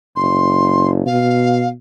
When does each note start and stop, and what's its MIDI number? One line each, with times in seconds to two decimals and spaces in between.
0.16 1.03 30
0.16 0.90 84
1.06 1.73 47
1.06 1.68 77